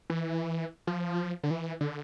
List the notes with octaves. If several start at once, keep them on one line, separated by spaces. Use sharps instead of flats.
E3
F3
D3
E3
D3